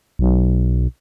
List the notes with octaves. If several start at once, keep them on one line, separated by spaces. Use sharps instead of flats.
B1